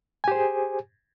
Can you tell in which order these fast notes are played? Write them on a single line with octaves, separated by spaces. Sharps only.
G#5 G4 C5 G#4